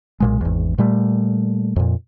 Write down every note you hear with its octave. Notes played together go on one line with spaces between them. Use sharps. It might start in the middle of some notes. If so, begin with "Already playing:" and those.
B1 A#2 G#3
G#1 E2
A#2 G3 A3
F2 A#2